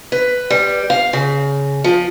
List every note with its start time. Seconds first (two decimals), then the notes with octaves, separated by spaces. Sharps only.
0.12 B4
0.50 G3
0.90 F5
1.13 C#3
1.84 F3